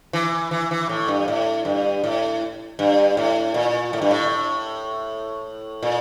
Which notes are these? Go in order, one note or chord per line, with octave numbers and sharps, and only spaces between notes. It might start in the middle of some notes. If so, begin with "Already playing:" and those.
E3
E3
E3
A2
G2
A2
G2
A2
G2
A2
A#2
A2
G2
A2
A#2